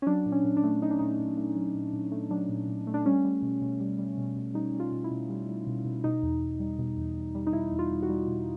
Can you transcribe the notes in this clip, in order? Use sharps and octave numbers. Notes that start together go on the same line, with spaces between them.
C#4
F#3 D4
A#2
C#4
A#2
D4
A3
F#3 D#4
D4
A#2 D#4
A#2
A3
F#3
A#2
A#2
A3
F#3 D4
A#2
A#2
A3
D4
G3 C#4
G3
B2
B2
G3
G3
B2
B2
G3 D#4
G3
F4
B2
E4
B2
G3
G3
B2
B2
B2 D#4
E2
E2
G3
B2
E2
E2
G3
D#4
B2 E4
E2
F4
E2
F#4
G3
B2